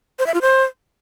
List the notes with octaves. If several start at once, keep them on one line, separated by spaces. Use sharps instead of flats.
C5
E5
F4
C5